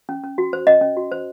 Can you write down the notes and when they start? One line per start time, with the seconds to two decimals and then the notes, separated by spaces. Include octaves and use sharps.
0.09 C#4
0.23 C#4
0.38 F#4
0.53 C5
0.67 C#4 D#5
0.81 C#4
0.97 F#4
1.12 C5